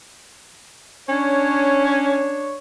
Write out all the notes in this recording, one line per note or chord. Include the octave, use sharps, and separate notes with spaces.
C#4 D4 C#5